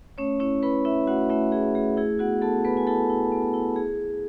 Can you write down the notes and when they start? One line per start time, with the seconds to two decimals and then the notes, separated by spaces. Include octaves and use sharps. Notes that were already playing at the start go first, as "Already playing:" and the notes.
0.18 A3 C#4 C#5
0.40 C#4 E4 C#5
0.63 E4 B4 B5
0.85 E4 E5
1.07 A3 F#4 F#5
1.30 A3 E4 E5
1.52 E4 G#4
1.75 A3 G#4
1.97 E4 G#4
2.19 B3 F#4 F#5
2.42 B3 A4 A5
2.65 B3 B4 B5
2.77 G#5
2.87 E4 A4 A5
3.10 E4
3.32 B3
3.54 E4
3.76 G#4